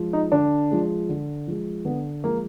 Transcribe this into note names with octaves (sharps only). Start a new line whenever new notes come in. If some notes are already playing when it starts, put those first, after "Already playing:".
Already playing: F3 G#3
D#4
D3 D4
F3 G#3
D3
F3 G#3
D3 B3
F3 G#3 A#3